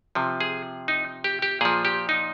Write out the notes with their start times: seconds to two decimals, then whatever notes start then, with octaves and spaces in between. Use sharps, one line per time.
0.15 C3 F3
0.41 G#4
0.88 D#4
1.24 G4
1.42 G4
1.61 A#2 F3 G#4
1.85 G4
2.09 D#4